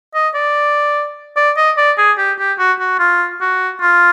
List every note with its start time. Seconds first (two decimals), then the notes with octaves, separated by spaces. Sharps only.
0.15 D#5
0.35 D5
1.37 D5
1.57 D#5
1.78 D5
1.98 G#4
2.18 G4
2.39 G4
2.59 F#4
2.80 F#4
2.99 F4
3.41 F#4
3.82 F4